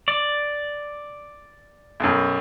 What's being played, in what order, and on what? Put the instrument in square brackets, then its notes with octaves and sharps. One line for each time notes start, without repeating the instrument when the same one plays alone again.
[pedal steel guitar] D5
[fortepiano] B1 F#2